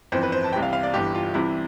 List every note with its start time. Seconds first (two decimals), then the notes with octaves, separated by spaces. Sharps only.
0.12 G1 F2 E3 C5
0.23 B4
0.32 C5
0.44 A5
0.53 C2 C3 E3 G5
0.63 F5
0.73 F5
0.83 D5
0.94 G1 G2 E3 G4
1.15 F4
1.34 C2 C3 E3 E4